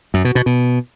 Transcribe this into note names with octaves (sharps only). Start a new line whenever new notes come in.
F#2
B2
B2
B2